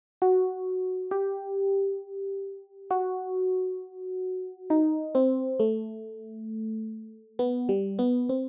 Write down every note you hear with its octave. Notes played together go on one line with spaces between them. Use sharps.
F#4
G4
F#4
D#4
C4
A3
B3
G3
B3
C4